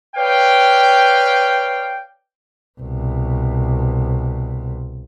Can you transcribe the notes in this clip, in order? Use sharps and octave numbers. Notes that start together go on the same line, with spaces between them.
B4 C#5 D5 F5 G5
C2 B2